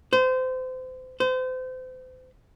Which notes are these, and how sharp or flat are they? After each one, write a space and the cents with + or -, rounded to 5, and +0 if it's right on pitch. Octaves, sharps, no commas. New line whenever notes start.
C5 -30
C5 -35